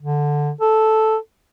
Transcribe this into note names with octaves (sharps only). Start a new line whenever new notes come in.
D3
A4